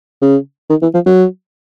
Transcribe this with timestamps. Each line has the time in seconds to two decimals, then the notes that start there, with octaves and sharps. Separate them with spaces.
0.22 C#3
0.70 D#3
0.82 E3
0.94 F3
1.06 F#3